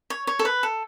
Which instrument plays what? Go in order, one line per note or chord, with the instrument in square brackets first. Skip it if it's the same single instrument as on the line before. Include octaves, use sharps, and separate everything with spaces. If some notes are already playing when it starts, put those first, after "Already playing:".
[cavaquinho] C#5
C#5
A4
B4
A4